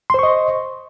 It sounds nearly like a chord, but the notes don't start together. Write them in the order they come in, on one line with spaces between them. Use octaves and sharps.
C6 C5 C#6 D#5